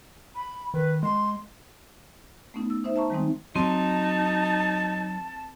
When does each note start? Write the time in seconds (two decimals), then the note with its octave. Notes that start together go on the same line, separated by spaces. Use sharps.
0.35 B5
0.74 D#3 B4
1.03 G#3 C6
2.54 A3 B3 C#4 D#4
2.70 E6
2.84 D#4 C5 E5
2.96 E5 A5 A#5 C#6
3.10 D#3 G3 G#3 C4 D#4
3.56 F#3 C4 D#4 A5